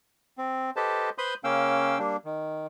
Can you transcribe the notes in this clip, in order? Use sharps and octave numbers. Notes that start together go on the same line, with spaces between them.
C4
G4 A4 B4 C5 D#5 A5
B4 C5 B5 C6 D#6 G6
C#3 A#3 C#4 F5 G5 E6
G3 A#3 D4
D#3